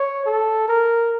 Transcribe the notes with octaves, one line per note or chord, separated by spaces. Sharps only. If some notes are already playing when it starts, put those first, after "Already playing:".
Already playing: C#5
A4
A#4